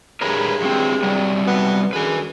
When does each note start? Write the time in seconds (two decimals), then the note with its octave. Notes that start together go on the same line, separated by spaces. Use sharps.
0.21 G2 E3 G#3 A#4 B4 C#5
0.62 F#3 C4
1.03 F#3 G3 C4
1.46 B2 B3
1.93 F#2 D3 G#3 B4 G#5